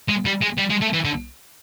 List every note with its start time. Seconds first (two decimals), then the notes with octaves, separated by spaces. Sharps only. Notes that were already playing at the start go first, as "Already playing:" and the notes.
0.09 G#3
0.26 G3
0.42 G#3
0.58 G3
0.70 G#3
0.82 A3
0.94 E3
1.05 D3